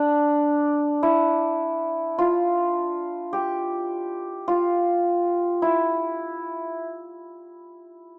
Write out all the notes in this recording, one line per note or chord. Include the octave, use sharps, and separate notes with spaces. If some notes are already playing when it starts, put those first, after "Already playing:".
Already playing: D4
E4
F4
G4
F4
E4